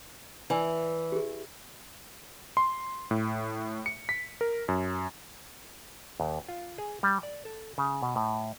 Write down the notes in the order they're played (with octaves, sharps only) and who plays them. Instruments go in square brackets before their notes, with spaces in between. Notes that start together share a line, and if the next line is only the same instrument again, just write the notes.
[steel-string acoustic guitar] E3 [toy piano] D5 G#5 E6
[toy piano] G4 G#4
[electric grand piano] C6
A2
C#7
B6
A#4
F#2
[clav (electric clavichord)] D#2
F4
G#4
G3
D5
A4
C#3
B2
A2